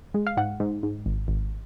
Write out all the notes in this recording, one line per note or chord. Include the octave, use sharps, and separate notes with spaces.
G#3
F5
G#2 F#5
G#2
G#2
G#1
G#1